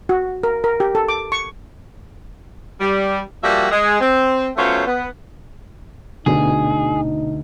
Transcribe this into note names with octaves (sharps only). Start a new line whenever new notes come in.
F#4
A#4
A#4
G4
A4
D6
C#6
G3
F3 G3 A#3 F#4 D5 E5
G#3
C4
F#3 A3 B3 C#4 F4 C5
B3
D2 B2 D3 D#4 G#4